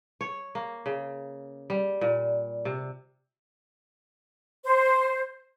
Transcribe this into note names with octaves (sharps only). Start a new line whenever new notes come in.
C#5
A#3
C#3
G3
A#2
C3
C5